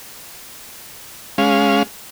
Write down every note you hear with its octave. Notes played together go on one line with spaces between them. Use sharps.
G#3 C#4 F5